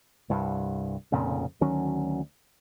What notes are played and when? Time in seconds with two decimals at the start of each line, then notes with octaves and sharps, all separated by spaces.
0.30 C2 G2
1.12 F1 F2 A#2 C#3
1.61 D2 D#3 F#3 C#4